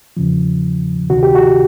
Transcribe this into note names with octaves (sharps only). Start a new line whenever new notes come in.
E2 C#3 F3
D2 C3 D#3 F#4
G4
F#4